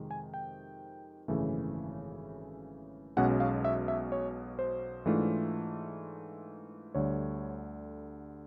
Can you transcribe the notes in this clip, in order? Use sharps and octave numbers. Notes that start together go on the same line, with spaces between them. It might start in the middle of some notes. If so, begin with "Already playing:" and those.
Already playing: F2 C3 D#3 G#3
G#5
G5
G#1 F#2 C#3 E3 A3
B1 B2 G#3 C#4 F#5
F5
E5
E5
C#5
C5
G#2 E3 A3 D4 F4
D2 D3 G3 C#5